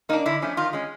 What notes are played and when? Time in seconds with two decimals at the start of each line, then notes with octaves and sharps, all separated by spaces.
0.09 A#3 D#4
0.13 D4
0.26 D3 E4
0.42 F3 A3 C#4
0.57 D#3 F4
0.73 G#3 C#4